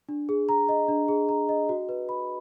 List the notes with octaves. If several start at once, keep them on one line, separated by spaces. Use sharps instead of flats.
D4
G#4
A#5
D#5
D4
G#4
A#5
D#5
F#4
B4
B5